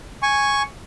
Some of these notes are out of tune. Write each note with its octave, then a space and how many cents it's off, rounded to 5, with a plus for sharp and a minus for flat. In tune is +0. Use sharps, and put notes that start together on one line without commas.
G#5 +0 C#6 +0